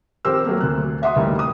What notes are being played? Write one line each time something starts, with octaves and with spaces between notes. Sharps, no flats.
F2 D#3 G4 A#4 C5 E6
F#3 A3 A#3
D2 A#3 F#6
D#5 E5 F#5 C6 D#6
A1 D2 G3 A#3 D#4
D#6